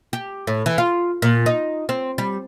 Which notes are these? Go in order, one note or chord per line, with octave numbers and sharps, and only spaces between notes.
G4
A2
E3
F4
A#2
D#4
C4
G3